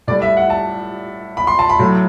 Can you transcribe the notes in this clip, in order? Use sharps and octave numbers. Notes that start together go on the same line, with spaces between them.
A2 G3 D5
E5
F#5
A5
B5
C6
A5
B5
A2 F#3 A3